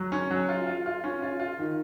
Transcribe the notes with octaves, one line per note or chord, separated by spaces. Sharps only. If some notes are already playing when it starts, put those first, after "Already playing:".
Already playing: F#3
C#4
F#3
F4
F4
F4
C#4
F4
F4
D#3